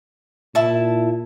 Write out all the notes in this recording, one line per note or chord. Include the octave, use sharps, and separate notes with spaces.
A#2 E4 A5